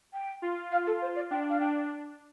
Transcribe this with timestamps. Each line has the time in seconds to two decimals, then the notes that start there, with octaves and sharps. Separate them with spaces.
0.13 G5
0.42 F4
0.72 F5
0.87 A4
1.01 C5
1.16 D5
1.31 D4 G5
1.49 F5
1.60 D4 G5